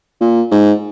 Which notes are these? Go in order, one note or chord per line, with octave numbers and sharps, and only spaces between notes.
A#2
G#2